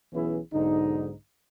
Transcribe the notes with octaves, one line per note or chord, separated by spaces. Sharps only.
B1 E3 B3 C#4 E4 G#4
B1 G#2 D3 D#4